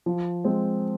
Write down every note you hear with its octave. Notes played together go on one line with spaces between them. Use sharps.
F3
G#3 C4